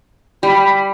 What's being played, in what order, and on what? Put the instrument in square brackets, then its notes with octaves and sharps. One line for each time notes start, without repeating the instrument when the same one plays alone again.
[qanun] G3 [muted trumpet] B5